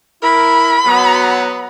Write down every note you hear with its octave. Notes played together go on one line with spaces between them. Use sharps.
E4 A#4 B5
F#3 B3